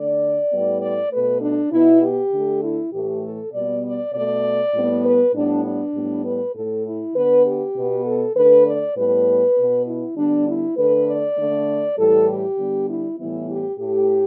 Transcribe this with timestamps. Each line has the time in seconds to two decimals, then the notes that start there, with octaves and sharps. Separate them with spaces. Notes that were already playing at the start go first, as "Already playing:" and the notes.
Already playing: D3 A3 D5
0.52 A2 G3 B3
0.82 D5
1.12 B2 A3 B4
1.41 D4
1.71 B2 B3 E4
2.02 G4
2.32 D3 A3
2.63 E4
2.93 A2 E3 A3 G4
3.23 A4
3.53 B2 G3 B3 D5
3.84 D5
4.13 B2 A3 D5
4.74 A2 G3 B3
5.04 B4
5.34 A2 G3 B3 D4
5.64 D4
5.94 A2 G3 B3
6.24 B4
6.54 A2 A3 A4
6.85 E4
7.15 D3 B3 B4
7.46 G4
7.76 B2 B3
8.05 A4
8.36 D3 A3 B4
8.66 D5
8.96 A2 G3 B3 B4
9.56 B2 B3
9.87 E4
10.17 D3 G3 B3 D4
10.47 E4
10.77 D3 A3 B4
11.07 D5
11.37 D3 A3
11.97 A2 E3 G3 A4
12.28 G4
12.58 D3 G3 B3
12.88 E4
13.18 A2 E3 G3 B3 E4
13.49 G4
13.78 A2 A3 G4